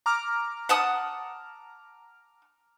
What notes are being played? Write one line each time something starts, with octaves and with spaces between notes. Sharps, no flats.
A#5 D6 F6
F#5 A5 D#6